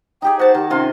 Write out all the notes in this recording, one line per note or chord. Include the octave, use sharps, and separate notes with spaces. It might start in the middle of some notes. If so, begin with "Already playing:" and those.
D#4 G4 G#4 G5
F#4 C5 A5
D#3 G4
C3 C#4 F4 C6